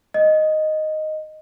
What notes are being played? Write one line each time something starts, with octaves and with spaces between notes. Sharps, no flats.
D#5